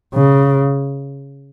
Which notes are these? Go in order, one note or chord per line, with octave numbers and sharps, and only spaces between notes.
C#3